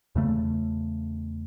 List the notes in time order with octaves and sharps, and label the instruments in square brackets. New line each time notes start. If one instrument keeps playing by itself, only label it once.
[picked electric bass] E2 C#3 A3